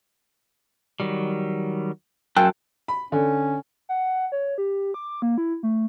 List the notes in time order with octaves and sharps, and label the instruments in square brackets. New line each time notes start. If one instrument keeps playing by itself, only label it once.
[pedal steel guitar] D#3 F#3 G3
[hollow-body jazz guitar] F#2 G5 [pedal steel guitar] A5 E6 F#6
[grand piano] B5
[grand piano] D3 [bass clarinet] C#4
[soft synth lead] F#5
C#5
G4
D6
A#3
E4
A3